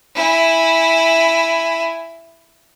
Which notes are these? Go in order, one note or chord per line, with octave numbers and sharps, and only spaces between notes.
E4 G#5